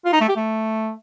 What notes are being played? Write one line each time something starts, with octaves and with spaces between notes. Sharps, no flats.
F4
D#4
A3
G4
A3